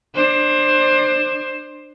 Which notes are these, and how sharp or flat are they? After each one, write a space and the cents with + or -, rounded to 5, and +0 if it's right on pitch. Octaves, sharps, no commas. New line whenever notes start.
D4 +30 C5 +20